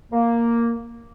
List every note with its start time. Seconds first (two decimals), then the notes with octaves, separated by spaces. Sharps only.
0.12 A#3